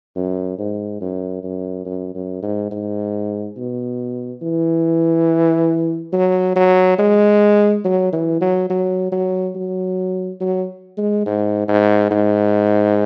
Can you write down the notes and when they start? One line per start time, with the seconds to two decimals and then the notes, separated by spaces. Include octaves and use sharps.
0.16 F#2
0.58 G#2
1.01 F#2
1.43 F#2
1.85 F#2
2.15 F#2
2.42 G#2
2.71 G#2
3.57 B2
4.42 E3
6.13 F#3
6.56 F#3
6.99 G#3
7.84 F#3
8.12 E3
8.41 F#3
8.70 F#3
9.12 F#3
9.55 F#3
10.41 F#3
10.97 G#3
11.26 G#2
11.68 G#2
12.11 G#2